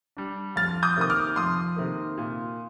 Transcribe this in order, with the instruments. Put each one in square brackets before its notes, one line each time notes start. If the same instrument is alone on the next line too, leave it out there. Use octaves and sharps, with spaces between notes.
[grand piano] G3 D4
F2 F6 A6
D#6 G6
C3 D#3 A#3 D#6
D6 F6
F2 C6 D#6
C3 D#3 A#3
A#2